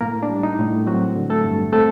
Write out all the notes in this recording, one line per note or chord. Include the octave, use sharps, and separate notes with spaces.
A2 A#3 A#4
D4
G3
D#4
A2
F#3 C4 F#4
D3
A3 A4
G2
A3 C4 A4